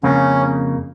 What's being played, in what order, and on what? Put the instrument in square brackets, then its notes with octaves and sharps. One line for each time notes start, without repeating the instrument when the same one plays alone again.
[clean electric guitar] F2 C#3 A#3 [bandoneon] C#4